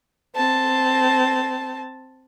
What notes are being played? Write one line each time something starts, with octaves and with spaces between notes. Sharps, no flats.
C4 A5